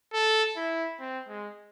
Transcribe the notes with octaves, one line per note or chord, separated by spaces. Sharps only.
A4
E4
C4
G#3